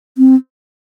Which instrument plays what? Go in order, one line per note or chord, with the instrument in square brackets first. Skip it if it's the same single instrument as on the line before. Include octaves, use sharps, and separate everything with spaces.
[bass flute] C4